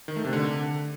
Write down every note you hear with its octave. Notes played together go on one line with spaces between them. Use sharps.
D#3
A3
C3
D3